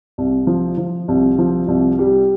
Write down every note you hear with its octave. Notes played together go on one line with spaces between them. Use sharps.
C2
F3
F3
C2
F3
C2
G3